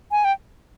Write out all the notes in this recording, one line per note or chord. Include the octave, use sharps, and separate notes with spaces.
G#5
G5